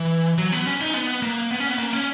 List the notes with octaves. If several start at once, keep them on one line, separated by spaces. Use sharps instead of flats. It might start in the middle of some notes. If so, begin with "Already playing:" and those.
Already playing: E3
F#3
B3
C#4
D#4
B3
A#3
B3
C#4
B3
A#3
C#4